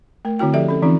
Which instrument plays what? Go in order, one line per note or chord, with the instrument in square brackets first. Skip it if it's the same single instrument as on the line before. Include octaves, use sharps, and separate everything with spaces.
[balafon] A3 A#4
D3 C4 E4 F#4 G5
F3 G4 A4 D5 E5
C#4 A4
E3 C4 C#4 D#4 F4